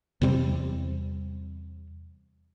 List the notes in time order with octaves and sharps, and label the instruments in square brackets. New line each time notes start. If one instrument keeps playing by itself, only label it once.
[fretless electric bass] E2 C3 G3 C4